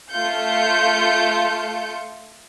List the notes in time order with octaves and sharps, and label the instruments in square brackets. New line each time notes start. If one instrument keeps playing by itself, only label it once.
[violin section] A3 F4 F5 G6 C#7